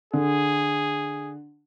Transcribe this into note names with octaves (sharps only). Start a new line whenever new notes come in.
D3 G#4